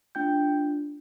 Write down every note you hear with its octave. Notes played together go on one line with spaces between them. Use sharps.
A3 D4 F4 G5 G6